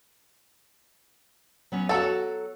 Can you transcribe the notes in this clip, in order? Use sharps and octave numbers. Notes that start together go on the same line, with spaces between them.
F#3 B3 C#4
F#3 F#4 A4 F#5